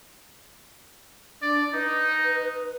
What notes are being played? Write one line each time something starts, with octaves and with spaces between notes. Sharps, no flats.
D4 D5
D#4 B4